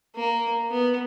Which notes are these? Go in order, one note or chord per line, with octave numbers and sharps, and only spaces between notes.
A#3
B3